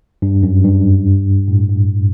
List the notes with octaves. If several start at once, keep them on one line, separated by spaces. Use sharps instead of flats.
G2
F#2
G2
A2
G2